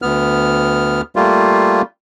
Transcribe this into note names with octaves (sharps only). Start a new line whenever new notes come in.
D2 B3 F6
G3 A3 A#3 F4